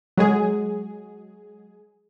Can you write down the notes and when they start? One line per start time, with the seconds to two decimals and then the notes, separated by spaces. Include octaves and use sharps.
0.17 F#3 G#3 G#4